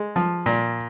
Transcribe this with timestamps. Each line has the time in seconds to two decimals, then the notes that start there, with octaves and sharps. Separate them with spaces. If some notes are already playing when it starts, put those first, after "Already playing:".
Already playing: G#3
0.16 F3
0.46 A#2